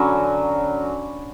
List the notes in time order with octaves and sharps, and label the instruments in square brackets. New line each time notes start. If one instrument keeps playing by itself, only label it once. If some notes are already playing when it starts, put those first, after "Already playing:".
Already playing: [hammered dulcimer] D3 F#3 C#4 G#5 B5